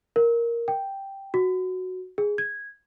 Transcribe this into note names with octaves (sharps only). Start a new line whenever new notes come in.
A#4
G5
F#4
G#4
G#6